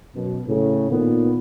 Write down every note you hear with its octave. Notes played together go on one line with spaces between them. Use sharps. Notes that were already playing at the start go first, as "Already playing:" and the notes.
F#2 B2
A2 C#3
A#2 D#3 B3